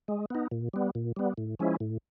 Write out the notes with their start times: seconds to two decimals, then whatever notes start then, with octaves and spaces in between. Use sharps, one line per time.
0.08 G#3
0.30 B3 D#4
0.51 A#2
0.73 G3 B3
0.95 A#2
1.16 G3 B3
1.37 A2
1.59 F3 G#3 C#4 E4
1.80 A2